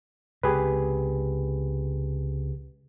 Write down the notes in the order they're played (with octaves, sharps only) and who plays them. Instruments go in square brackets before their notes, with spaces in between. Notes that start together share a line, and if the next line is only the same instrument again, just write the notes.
[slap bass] C#2 C3 [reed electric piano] G4 G#4 B4